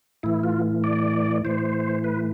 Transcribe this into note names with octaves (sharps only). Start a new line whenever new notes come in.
A2 E3 E4
F4
D5
A2 E3 C5
B4